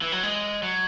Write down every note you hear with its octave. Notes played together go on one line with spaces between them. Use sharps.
E3
F#3
G#3
F#3